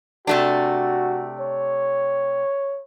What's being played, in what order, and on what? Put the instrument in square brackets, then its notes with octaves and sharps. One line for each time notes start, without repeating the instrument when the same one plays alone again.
[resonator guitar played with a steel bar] C3 A3 D4 [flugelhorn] F#4
[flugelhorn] C#5